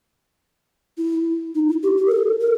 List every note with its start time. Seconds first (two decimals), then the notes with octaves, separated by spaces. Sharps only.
0.98 E4
1.55 D#4
1.69 E4
1.83 G4
1.97 G4
2.07 A#4
2.12 A4
2.41 A#4